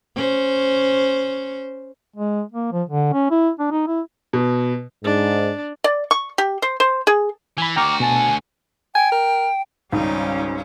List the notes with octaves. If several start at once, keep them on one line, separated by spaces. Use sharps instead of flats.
C#4 C5
G#3
A#3
F3
D3
C#4
E4
D4
D#4
E4
B2
G#2 D4
D5
C#6
G4
C5
C5
G#4
E3 G#5 B5
D2 F#4 G5 A#5 D6 F6
B2 G#5 A5
G5 G#5
A#4
G#1 C#2 G#2 G3 C#4 D#4